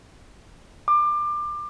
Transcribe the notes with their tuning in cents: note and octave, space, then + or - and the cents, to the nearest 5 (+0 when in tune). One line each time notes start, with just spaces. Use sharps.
D6 +25